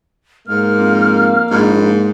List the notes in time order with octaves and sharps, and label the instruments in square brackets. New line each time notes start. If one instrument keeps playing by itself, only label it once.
[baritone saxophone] G#2 [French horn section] A#3 [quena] F6
[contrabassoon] F2
[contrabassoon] A#1 [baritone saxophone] G#2